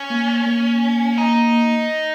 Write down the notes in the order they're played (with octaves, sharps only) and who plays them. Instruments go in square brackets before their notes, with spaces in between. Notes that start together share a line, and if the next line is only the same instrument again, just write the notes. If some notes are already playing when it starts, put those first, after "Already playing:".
Already playing: [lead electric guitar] C#4
[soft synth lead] A#3
A#3
[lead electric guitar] D#4